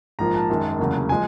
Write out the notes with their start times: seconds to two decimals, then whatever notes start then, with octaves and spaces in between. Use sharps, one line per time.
0.19 A#1 G#2 F3 A#3 A#5
0.34 A5
0.50 F#2 D#3 G#3
0.79 F1 E2 C#3 F#3 A#3
1.09 F3 G#3 G#5